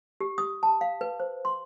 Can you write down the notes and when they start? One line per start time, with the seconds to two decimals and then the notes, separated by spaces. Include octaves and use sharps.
0.21 G4
0.38 D#6
0.63 A5
0.81 F5
1.01 B4
1.20 C5
1.45 C6